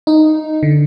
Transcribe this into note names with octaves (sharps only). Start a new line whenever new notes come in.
D#4
D3